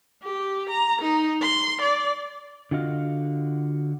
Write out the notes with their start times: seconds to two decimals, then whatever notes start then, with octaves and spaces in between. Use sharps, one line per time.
0.24 G4
0.70 A#5
1.02 D#4
1.42 C6
1.82 D5
2.71 D3 F4 F#4 D#5 F5